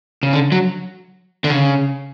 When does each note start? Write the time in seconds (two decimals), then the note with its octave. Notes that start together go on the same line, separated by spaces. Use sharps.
0.23 C#3
0.33 D3
0.52 F#3
1.44 D3
1.50 C#3